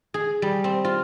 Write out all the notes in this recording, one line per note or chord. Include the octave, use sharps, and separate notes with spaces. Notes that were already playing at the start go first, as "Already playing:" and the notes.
G#4
G3
C4
F4